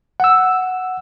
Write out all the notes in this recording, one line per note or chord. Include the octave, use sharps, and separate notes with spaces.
F#5 E6